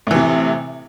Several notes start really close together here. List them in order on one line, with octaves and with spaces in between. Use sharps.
A2 E3 C3